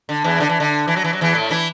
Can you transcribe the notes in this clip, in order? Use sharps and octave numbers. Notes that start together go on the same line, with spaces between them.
D3
E2 E3
D3
E3
D3
E3
F#3
E3
F#3
E2 E3
A2 A3
E3 E4